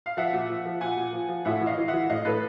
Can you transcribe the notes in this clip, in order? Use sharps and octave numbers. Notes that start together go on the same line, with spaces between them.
F5
F3 E5 F#5
A#2
F3
F3
A#2 F#5 G#5
A#2
F3
F3
A2 E5 F#5
E3
D#5 F5
E3
E5 F#5
E3
A2 D#5 F5
A2 A4 B4